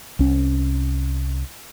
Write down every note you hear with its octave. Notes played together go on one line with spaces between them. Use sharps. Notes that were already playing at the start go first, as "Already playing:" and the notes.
C2 C#4